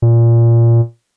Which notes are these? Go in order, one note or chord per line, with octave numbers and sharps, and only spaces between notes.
A#2